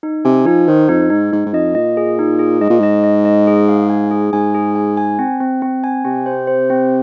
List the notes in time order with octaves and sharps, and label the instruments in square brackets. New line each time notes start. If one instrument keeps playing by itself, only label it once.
[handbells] D#4
[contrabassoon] C3 [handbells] G#5
[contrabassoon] F3 [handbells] D#4
[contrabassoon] D#3 [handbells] C5
[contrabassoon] F2 [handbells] D#4
[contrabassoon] G#2 [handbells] D#4
[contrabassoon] G#2 [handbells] D#4
[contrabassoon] G#2
[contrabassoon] F2 [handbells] D#5
[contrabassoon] A#2 [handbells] D#5
[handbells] G#4
D#4
G#4
[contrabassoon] G#2 [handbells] D#5
[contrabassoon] A#2
[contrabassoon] G#2 [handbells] D#5
[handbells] D#5
D#5
G#4
F5
G#5
G#4
[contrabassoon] G#2 [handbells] G#5
[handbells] G#4
G#5
G#5
C4
C4
C4
G#5
[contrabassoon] C3 [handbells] C4
[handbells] C5
C5
C4